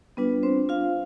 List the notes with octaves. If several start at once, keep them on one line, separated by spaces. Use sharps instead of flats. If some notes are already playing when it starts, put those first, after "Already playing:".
G3 B3 D4 F4 B4
C4 C5
F4 F5